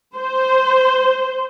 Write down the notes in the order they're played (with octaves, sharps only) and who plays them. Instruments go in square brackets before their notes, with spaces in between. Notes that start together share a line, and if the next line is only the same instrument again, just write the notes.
[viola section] C5